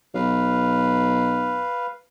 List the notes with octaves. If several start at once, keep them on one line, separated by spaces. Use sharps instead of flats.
B1 B4 F5